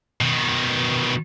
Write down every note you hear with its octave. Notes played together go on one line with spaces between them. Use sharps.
B2 D#3